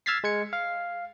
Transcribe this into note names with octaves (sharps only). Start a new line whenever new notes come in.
E6 F6 G#6 A6 B6 C7
G#3 G#6 C#7
F5